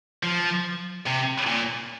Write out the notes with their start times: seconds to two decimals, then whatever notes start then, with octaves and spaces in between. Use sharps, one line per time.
0.23 F3
1.06 C3
1.47 A#2